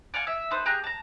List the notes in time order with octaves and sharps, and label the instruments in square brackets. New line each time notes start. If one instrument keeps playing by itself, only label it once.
[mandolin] D5 F5 F#5 G#5
E5
D#4 A4 B4 C5
G4 G#4 A#5 F#6
A5 A#5